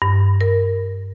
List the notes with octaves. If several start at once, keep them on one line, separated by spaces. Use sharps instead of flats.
G2
A#4